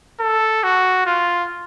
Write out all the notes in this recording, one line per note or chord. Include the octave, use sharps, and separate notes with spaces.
A4
F#4
F4